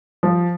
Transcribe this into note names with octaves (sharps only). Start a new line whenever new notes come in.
F3